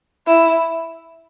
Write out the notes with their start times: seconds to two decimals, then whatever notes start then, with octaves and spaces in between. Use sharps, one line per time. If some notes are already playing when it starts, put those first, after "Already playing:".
0.27 E4